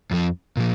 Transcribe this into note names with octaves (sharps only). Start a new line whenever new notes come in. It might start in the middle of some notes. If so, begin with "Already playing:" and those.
F2 F3
A#2 F3